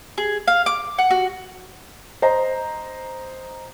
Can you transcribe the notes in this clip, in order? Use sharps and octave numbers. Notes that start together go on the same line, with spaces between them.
G#4
F5
D6
F#5
F#4
C5 D#5 A#5